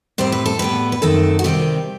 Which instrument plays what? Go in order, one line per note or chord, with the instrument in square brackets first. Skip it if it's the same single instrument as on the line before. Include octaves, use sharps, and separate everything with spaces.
[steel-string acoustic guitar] A2 G3 C4 C5
B4
A4
A2 G3 B3 B4
B4
F#2 D#3 A3 C4 A4
F#4
C3 D#3 G3 C4 G4